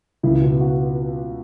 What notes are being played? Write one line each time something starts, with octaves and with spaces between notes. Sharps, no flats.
C#2 E4
B2
F#4